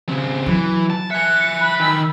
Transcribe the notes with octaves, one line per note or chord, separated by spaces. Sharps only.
C#3 C4
E3 F#3
A5
E5 G#5 F#6 C#7
B5
D#3 E6